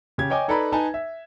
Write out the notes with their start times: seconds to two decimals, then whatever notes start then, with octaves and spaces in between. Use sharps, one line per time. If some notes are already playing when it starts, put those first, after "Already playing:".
0.18 C#3 G4 G#6
0.30 C#5 D#5 G5 G#5 D6
0.48 D#4 A4 B4 D5 A#5 B5
0.72 D#4 B4 G#5 A5
0.94 E5